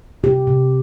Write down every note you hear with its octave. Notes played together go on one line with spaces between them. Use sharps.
C3 G4
C3